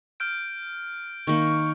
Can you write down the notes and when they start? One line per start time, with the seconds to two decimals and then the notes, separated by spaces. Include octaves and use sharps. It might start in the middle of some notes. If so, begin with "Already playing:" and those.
0.20 F6 G6 D7
1.27 D#3 A#3 C#6